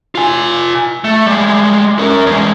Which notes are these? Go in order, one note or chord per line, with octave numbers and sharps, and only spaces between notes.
F4 G#5
A3
G3 G#3
C#4 A#4
E2 G#3